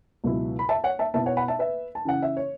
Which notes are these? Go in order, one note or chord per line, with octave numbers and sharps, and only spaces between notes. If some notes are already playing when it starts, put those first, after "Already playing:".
C#2 B2 F#3 B3 E4
B5
E5 A5
C#5 F#5
E5 A5
B2 B3 E4 E5 A5
C#5 F#5
F#5 B5
E5 A5
B4 E5
A5
C#3 E3 C#4 E4 F#5
E5
C#5